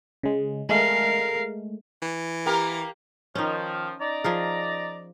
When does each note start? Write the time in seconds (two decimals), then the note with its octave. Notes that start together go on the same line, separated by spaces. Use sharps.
0.23 C#3 G#3
0.69 G#3 A3 A#4 F5
2.02 E3
2.46 A#3 G4 A#4
3.35 D#3 F3 C#4 D#4
4.00 D#4 D5 A#5
4.24 F3 G#4 A#4